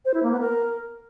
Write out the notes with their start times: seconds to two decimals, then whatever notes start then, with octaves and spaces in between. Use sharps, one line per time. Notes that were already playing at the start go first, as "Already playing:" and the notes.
0.05 C5
0.14 E4
0.23 A#3
0.32 B3
0.40 A#4